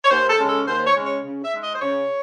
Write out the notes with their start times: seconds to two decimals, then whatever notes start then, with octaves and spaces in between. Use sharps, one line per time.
0.04 C#5
0.10 D#2 C5
0.30 A4
0.39 C#3 G#3 C#4
0.49 A4
0.67 D#2 C5
0.86 C#5
0.96 C#3 G#3 C#4
1.05 C#5
1.24 C#3
1.44 E5
1.53 G#3 D#4
1.62 D#5
1.74 C5
1.81 C#3 C#5